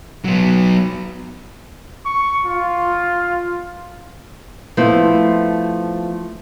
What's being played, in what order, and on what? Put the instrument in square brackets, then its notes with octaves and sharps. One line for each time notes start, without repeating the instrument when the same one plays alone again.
[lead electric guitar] F#3 B3
[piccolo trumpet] C#6
F4
[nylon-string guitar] F3 A3 B3 C4 E4